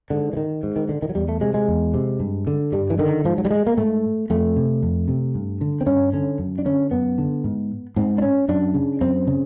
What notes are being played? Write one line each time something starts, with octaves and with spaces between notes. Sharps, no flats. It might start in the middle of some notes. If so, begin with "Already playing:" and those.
G#2 D3
E3
D#3
G#2
D#3
D3
D#3
F#3
E2 G3
A3
C3 G#3
G#3
E2
C3
G2
D3
G2 G3
E3
D3 D#3
G#2 F3
F#3
G3
G#3
A#3
G#2 A3
F2 A3
C3
F2
C3
G2
D3
C4
G2 C#4
D3 C#4
F#2
D4
D3 C#4
F#2 B3
D3
G#2
G#2 C4
D4
C#4
F#2 D4
C#3
F#2 C4
C#3